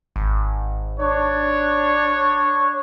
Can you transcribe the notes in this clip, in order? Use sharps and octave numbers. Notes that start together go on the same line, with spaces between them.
G#1
D4 C#5